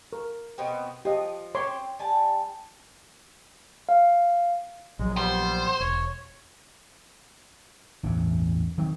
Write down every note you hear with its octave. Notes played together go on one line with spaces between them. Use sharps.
A#4
B2 B3 C4
F3 G4 D#5
C4 C#5 C6 D6
G3 G#5 A5
F5
A#1 F#3 G#3
G3 B3 C5
E1 C#5
A1 E2 G2 C3
D#3 F#3 G#3 C4